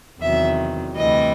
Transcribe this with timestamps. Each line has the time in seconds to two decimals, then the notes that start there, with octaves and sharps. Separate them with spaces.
0.20 E2 C3 D#3 F#3 E5
0.95 D2 C3 E3 G3 D#5